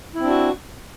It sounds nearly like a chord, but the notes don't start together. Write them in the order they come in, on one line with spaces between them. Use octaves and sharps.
E4 C4 D4 F#4